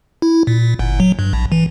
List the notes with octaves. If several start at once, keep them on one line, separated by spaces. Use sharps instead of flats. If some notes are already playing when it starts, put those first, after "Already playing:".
E4
A#2
G1
F#3
G2
A#1
E3